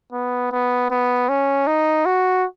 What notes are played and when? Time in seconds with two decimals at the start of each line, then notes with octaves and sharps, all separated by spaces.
0.13 B3
0.52 B3
0.91 B3
1.29 C#4
1.67 D#4
2.06 F#4